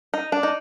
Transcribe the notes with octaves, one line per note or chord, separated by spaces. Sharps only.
D#4
D4
D#4